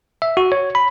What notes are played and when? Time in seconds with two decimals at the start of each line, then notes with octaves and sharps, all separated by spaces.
0.22 E5
0.37 F#4
0.52 C#5
0.75 B5